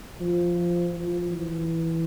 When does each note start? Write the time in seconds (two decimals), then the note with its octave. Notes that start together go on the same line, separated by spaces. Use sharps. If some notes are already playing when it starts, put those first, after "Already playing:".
0.21 F3
0.94 F3
1.31 E3